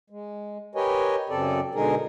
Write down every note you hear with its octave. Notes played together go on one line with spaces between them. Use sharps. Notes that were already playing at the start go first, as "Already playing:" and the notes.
G#3
G4 A#4 B4 C#5 D#5 G#5
F#2 C#3 C4 A4 D5
B2 D3 G#3 D#4 G#4 A#4